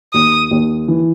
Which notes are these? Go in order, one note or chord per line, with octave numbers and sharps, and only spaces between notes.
D#2 D#6
D#2
E3